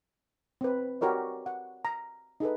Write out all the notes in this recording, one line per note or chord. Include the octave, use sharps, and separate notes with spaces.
C4 B4
F#4 G4 A#4 C#5 D#5
F#5
A#5
D#4 G#4 A4 B4